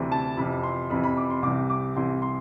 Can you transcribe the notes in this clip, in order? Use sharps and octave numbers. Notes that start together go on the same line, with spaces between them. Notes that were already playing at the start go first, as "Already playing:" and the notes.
Already playing: D2 C3 E3
A5
F2 C3 E3 B5
C6
F2 C3 E3 B5
B5
D6
C6
C2 C3 E3 D6
D6
C2 C3 E3 C6
C6